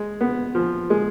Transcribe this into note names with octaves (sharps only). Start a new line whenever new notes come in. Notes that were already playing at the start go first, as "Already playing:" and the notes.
Already playing: G#3
B3
F3
G#3